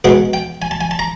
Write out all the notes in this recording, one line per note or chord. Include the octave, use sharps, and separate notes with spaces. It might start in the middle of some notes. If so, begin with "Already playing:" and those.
B2 G#3 B3 F#5
G5
G#5
A5
G#5
A5
A#5